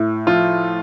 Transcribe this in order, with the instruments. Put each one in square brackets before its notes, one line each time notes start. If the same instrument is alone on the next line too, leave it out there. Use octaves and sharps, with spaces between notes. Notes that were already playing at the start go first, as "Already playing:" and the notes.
Already playing: [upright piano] A2
[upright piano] F3 [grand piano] F4